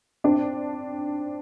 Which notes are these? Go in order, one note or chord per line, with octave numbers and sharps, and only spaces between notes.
C4 D4